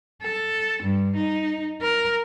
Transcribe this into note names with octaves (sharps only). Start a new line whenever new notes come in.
A4
G2
D#4
A#4